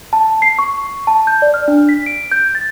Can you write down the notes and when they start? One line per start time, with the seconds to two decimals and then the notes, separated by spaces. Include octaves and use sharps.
0.13 A5
0.42 C7
0.59 C#6
1.07 A5
1.27 G6
1.42 D5
1.54 F6
1.68 D4
1.89 B6
2.06 D7
2.32 G6
2.55 A6